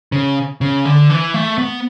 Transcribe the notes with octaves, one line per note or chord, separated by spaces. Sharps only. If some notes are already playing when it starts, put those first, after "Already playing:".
C#3
C#3
D3
E3
A3
B3